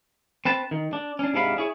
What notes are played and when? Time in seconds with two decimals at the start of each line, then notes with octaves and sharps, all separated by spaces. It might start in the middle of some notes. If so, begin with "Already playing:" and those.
0.45 C4 B4 A5
0.71 D#3
0.93 D4
1.19 C#4 D4
1.34 G#2 C3 D4 F5 B5
1.57 E4 G#4 C#5